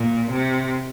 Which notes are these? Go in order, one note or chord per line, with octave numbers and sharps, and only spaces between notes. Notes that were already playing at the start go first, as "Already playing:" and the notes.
Already playing: A#2
C3